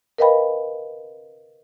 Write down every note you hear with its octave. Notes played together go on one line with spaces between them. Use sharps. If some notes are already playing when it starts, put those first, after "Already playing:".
A#4 B4 D#5 F5 G5 B5